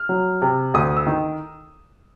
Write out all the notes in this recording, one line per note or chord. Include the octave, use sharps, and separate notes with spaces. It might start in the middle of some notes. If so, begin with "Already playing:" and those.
Already playing: F6
F#3
C3
D2 D#6
E6
D#3